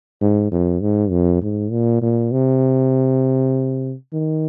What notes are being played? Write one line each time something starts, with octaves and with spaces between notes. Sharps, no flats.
G#2
F2
G#2
F2
G#2
A#2
A#2
C3
D#3